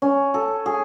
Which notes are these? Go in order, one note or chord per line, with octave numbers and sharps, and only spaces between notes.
C#4
A4
G#4